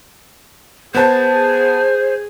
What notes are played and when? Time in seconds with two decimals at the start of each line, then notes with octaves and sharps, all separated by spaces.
0.95 B3 G#4 C5 A5